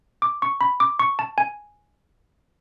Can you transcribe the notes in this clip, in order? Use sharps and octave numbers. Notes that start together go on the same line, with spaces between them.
D6
C#6
B5
D6
C#6
A5
G#5